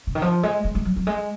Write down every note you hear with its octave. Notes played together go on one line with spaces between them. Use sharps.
C#3
D#3
F3
G#3
G#3
G#3
F#3
F#3
G#3